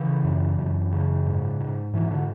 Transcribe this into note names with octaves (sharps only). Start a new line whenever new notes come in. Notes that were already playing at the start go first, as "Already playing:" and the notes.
Already playing: C#3 E3
F#2
F#2
C#3
G#2
G#2
G#2 E3
D3